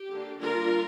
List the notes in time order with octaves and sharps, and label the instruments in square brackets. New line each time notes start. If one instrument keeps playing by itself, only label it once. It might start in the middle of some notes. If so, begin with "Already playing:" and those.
Already playing: [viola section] G4
D3 A#3 D4
D3 G3 A#3 D4 F4 A#4